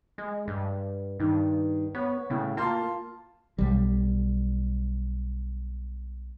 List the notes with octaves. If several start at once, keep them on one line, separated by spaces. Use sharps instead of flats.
G#3
G2
G2 D#3
B3 C#5
A2 C#3
A#3 F4 A5 C6
B1 G3